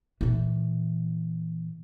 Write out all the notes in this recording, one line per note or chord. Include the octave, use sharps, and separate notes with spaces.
A#2 E3